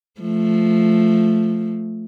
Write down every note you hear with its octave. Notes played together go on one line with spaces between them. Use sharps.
F3 A3